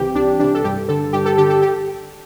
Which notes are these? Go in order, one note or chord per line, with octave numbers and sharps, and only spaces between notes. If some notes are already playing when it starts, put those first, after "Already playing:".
Already playing: C2 C3 E3 G4
C2 D4
C3 E3 D4
A4
G2 G4
D3 A4
G2 G4
A4
D3 G4
A4
G4